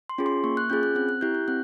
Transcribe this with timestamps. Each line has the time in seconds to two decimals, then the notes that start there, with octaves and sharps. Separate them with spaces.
0.09 C6
0.18 C#4 F4 G#4
0.26 C6
0.44 A#3 C#6
0.57 F#6
0.70 C#4 F4 G#4 G6
0.83 F#6
0.95 C4 F#6
1.09 F#6
1.21 E4 G4 G6
1.35 G6
1.48 C4 F#6